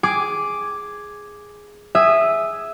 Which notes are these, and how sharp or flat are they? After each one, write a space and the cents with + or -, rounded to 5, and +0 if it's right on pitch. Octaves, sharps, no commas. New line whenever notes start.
G#4 +0 D6 +0
G#4 +0 E5 +0 D#6 -15